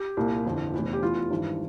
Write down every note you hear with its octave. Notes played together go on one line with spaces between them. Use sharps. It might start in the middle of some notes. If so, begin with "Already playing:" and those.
Already playing: G4
C2 A#2
G1 F2 E3
F1 E2 E3
G4
F1 E2 E3 F4
G#1 G2 E3